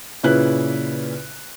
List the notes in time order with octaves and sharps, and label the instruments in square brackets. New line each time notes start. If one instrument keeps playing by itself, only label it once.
[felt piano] A#2 C#3 C#4 E4 B4 F#6